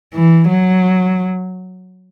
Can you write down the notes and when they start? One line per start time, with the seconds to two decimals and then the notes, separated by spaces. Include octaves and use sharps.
0.14 E3
0.49 F#3